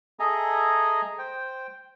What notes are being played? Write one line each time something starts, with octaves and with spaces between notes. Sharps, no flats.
G#4 A4 D#5 E5 G#5 A#5
C5 G5